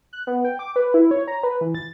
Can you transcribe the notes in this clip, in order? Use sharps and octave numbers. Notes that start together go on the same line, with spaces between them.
F#6
B3
G5
D6
B4
E4
C#5
A#5
B4
E3
A6